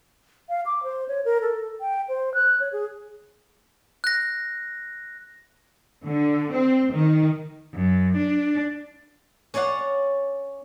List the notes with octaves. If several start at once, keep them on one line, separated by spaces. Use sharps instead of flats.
F5
D6
C5
C#5
A#4
A4
G5
C5
F#6
C#5
G#4
F#6 A#6
D3
C4
D#3
F#2
D4
C#4 C#5 D5 F5 F#5